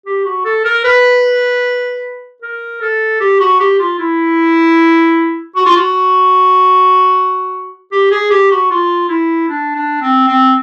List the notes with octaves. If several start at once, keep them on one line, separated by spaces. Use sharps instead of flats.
G4
F#4
A4
A#4
B4
A#4
A4
G4
F#4
G4
F4
E4
F#4
F4
F#4
G4
G#4
G4
F#4
F4
E4
D4
D4
C4
C4